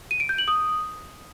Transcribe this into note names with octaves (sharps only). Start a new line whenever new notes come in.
D#7
D7
G6
F#7
D#6